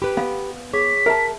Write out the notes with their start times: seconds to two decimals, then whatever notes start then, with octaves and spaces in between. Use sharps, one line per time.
0.02 G4 B4 B5
0.17 B3 F5
0.73 G#4 C#5 B6
1.06 A#4 E5 A5